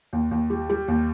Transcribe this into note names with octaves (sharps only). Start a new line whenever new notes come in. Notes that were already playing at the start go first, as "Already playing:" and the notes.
D#2
D#2
G3
G3
D#2